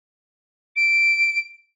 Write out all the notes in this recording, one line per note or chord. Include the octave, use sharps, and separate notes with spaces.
D7